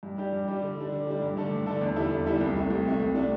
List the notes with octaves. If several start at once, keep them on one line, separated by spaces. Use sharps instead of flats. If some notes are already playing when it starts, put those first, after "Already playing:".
G2
G3 D4 G4
G2
G3 D4 G4
D3
G3 D4
D3
G3 D4
G2
D3 A3 D4 A4
G2
D3 A3 D4 A4
E2
D3 G3 E4 A4
E2
D3 G3 E4 A4
C2
C3 A3
C2
C3 A3
C2
C3 A3 D4